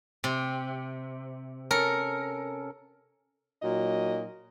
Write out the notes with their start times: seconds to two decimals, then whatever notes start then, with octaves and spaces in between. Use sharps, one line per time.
0.24 C3
1.71 C#4 A4 A#4 C#7
3.62 A#2 F#3 D#4 D#5